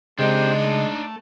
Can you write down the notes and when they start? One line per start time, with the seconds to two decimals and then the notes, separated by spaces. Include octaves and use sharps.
0.19 C#3 G#3 C4 D4 D#4 G4
0.65 A3